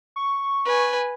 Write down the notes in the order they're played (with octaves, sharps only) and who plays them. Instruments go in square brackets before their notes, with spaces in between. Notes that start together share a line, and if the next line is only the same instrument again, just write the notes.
[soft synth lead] C#6
[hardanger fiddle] B4 G#5